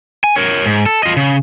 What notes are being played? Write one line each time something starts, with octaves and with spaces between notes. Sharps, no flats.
G#5
A#4 C#5
G#2
A4
F4 D#5
C#3